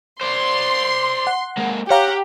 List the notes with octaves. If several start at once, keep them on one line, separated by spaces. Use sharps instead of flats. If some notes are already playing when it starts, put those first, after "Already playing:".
C5 D5 C6
F#5
G#3 A#3
G4 C#5 F5 F#5 A#5